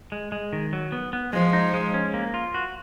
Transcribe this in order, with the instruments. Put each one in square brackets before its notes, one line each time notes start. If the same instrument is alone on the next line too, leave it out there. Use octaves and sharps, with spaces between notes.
[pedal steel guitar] G#3
G#3
D#3
F#3
B3
B3
[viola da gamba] F3 [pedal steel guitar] G#3
[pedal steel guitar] D#4
G#3
C#4
A#3
F4
F#4